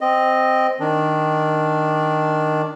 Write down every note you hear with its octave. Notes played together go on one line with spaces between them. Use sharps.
C4 D#5
D#3 D4